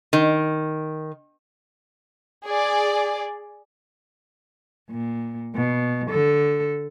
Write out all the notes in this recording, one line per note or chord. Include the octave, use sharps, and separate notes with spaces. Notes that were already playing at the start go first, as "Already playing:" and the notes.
D#3
G#4 D5
A#2
B2
D3 A4